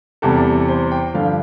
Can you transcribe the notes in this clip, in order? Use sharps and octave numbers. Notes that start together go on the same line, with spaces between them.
E2 C3 G3 A4
C5
G5
G2 D3 F3 F5